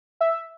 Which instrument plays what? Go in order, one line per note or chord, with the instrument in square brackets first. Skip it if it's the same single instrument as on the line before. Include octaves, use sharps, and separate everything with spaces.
[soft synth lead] E5